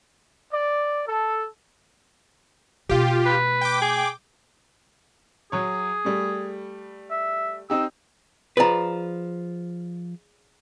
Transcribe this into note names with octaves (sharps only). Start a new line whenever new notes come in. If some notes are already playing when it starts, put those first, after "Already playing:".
D5
A4
B2 A3 F4 G4
B4
G5 D6
G#4
F#3 G#4 C#5
G3 A3
E5
C4 D#4 G4 E6
F3 G#4 B4 D5 A#5